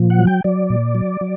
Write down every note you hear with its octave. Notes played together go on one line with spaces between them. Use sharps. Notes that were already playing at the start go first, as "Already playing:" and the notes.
Already playing: A#2 F3
F#5
F#3
G5
F#3 D5
A#2
F#3
F#3